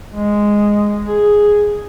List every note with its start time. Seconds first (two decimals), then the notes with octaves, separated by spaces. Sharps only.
0.12 G#3
1.06 G#4